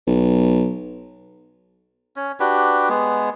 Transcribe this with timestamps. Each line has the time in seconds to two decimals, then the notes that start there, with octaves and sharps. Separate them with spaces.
0.07 B1
2.16 C#4
2.40 D4 F#4 G4 B4
2.89 G#3 B3